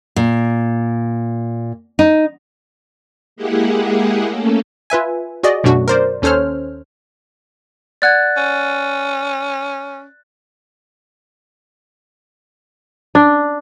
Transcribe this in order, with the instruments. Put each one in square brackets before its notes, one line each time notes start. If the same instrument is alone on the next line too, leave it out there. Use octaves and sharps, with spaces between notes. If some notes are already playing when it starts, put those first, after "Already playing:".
[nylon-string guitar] A#2
D#4
[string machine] G#3 A#3 E4 G4 G#4 F#5
A3 A#3 C#4 A4
[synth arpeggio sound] F4 B4 E5 G#5
F#4 G#4 D5 D#5
F#2 B2 F#3 A3 D4 F#4
A#4 C5 D5
D#2 C#4 A4 C5 C#5 F6
[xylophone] D5 F#5 G#6 [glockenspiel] F#6 A6
[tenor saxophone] C#4
[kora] D4